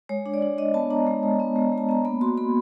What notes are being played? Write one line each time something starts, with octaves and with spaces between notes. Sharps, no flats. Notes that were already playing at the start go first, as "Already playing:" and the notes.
G#3 C#5
D4
D5
D4
D4 D#5
B3 A5
D4 A#5
G#3
G#3
B3
G#3
G#3
A5
B3 A#5
A#3 B5
F#4 C6
A#3 B5